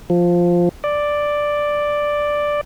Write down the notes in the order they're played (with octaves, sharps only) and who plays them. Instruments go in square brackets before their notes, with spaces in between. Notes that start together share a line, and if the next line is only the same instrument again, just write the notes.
[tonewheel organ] F3
D5